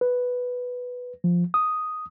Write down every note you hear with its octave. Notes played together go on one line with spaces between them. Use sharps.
B4
F3
D#6